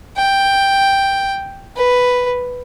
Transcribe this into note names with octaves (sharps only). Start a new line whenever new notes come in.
G5
B4